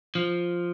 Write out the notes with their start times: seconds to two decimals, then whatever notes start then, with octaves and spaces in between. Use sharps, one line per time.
0.15 F3